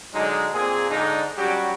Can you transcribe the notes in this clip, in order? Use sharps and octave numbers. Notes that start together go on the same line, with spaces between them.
D3 F#3 G#3 D#4
A#2 A#3 C4 G#4
G#2 D3 D4 D#4
F#3 G3 C#4 F#4 G4